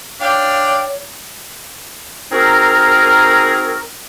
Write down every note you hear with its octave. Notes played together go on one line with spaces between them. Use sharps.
D4 C#5 F5 G5
C4 D#4 F#4 G#4 A#4